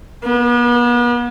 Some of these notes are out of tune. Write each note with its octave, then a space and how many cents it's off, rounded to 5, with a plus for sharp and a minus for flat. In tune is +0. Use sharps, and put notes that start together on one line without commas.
B3 -40